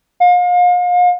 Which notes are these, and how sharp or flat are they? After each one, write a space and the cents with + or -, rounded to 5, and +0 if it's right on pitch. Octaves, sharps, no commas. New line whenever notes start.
F5 +35